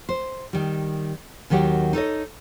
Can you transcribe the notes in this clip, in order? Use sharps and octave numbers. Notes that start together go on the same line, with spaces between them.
C5
D#3 G3
D#2 D#3 F#3 G4 F#5
D#4 A4 C#5 D#5